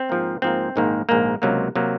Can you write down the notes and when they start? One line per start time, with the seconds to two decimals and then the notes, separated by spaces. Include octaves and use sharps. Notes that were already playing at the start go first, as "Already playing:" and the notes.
Already playing: C4
0.09 G#2 F3 A#3
0.42 G#2 F3 A#3 C4
0.76 A#1 G#2 D#3 A#3
1.09 A#1 G#2 D#3 A#3
1.42 C#2 C3 F#3 A#3
1.75 C3 F#3 A#3